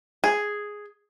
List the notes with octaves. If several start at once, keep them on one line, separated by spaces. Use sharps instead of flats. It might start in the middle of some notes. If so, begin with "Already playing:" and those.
G#4